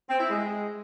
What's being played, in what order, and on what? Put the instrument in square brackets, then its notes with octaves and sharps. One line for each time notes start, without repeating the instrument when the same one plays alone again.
[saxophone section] C4
E4
G#3